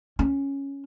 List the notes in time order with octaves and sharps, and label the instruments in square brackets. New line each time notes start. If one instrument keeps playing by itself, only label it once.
[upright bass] C#4